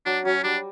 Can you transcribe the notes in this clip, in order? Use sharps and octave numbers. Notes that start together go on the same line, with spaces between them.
F#3 D4
F#3 C#4
G3 D4